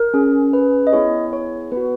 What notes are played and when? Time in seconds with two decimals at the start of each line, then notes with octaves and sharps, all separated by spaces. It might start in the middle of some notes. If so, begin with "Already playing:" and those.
Already playing: A#4
0.14 C#4 G#4
0.53 B4
0.87 D#5
0.92 B3 E4 G#4 C#5
1.33 C#5
1.72 B3 F#4 B4